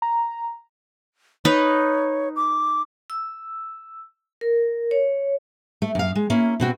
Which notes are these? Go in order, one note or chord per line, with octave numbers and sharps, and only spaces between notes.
A#5
D#4 B4 C#5
D6
E6
A#4
C#5
A3
F#2 F5
G#3
A#3 C#4 E4
B2 C4 F#4